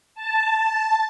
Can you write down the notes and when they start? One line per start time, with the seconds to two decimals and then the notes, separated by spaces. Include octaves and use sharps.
0.15 A5